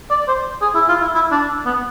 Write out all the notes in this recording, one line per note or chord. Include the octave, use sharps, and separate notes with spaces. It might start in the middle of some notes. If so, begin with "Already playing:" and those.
D5
C5
G#4
E4
F4
E4
E4
D4
B3